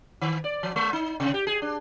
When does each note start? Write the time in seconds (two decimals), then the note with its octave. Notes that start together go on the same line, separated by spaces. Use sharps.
0.21 D#3
0.44 D5
0.63 F3
0.76 G#3
0.93 D#4
1.20 C3
1.34 G4
1.47 G#4
1.62 D4